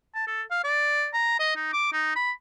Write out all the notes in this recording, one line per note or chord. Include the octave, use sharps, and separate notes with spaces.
A5
A4
F5
D5
A#5
D#5
D#4
D6
D#4
B5